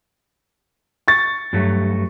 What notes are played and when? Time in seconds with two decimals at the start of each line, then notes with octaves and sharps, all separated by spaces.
1.08 C#6 A6
1.53 G2 F#3 A3